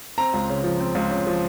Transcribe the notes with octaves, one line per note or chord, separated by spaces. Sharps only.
C4 A#5
C#2
C#3
F3
C4
C#2
C#3
F3